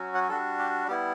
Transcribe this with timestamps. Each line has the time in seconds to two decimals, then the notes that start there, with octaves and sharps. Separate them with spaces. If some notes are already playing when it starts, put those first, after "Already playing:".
Already playing: F#3 C#4 F#4
0.15 F#5
0.29 G3 D4 F#4 A4
0.59 G4
0.88 G3 B3 E4 G4